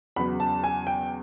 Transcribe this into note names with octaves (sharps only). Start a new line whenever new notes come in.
E2 C#3 F#3 B3 B5
A5
G#5
G5